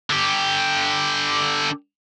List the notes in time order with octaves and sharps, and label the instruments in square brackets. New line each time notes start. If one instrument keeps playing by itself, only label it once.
[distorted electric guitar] D3 G4